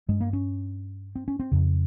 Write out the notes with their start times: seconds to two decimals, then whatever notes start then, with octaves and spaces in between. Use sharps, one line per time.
0.08 G2 G#3
0.21 A#3
0.33 C#4
1.16 C4
1.28 C#4
1.40 C4
1.51 F2 C#3